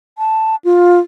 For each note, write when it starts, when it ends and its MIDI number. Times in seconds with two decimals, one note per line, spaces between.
0.18 0.56 81
0.65 1.00 65